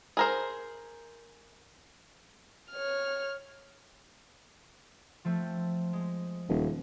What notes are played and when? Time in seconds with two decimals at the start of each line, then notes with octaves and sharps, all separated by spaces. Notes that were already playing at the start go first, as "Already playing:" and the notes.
0.17 G#4 A#4 C5
2.72 C#5 F6
5.25 F3 A3 C4
5.93 G#3
6.49 D#1